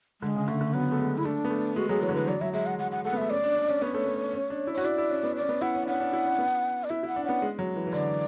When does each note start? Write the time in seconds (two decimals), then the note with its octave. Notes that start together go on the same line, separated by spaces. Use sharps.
0.22 D3 G#3
0.35 C#3
0.48 D3 A3
0.61 D3
0.73 F#3 B3
0.92 A3
0.99 G#3
1.17 E4
1.25 A3 D4
1.45 B3
1.50 A3
1.76 G#3 F#4
1.89 F#3 G#4
2.02 E3 C#5
2.09 D3
2.15 E3 B4
2.28 F#3 D5
2.41 F#3 E5
2.53 G#3 E5
2.66 F#5
2.79 F#3 F#5
2.91 F#5
3.05 A3 F#5
3.13 B3
3.17 A3 E5
3.30 C#4 D5
3.44 D4
3.56 D4
3.69 C#4
3.82 B3 C#5
3.94 A3
4.06 B3
4.33 C#4
4.50 D4
4.67 E4
4.73 F#4 C#5
4.84 E4 D5
4.98 E4
5.10 C#4
5.23 B3
5.36 D5
5.41 C#4
5.49 B3
5.62 E4 F#5
5.75 C#4
5.83 D4
5.87 C#4 F#5
6.00 D4
6.13 E4
6.25 C#4
6.39 B3
6.84 D5
6.90 E4 E5
7.03 E4
7.08 F#5
7.16 D4
7.24 B3 C#4 F#5
7.42 G#3
7.59 F#3
7.76 E3
7.87 E3
7.92 D3 D5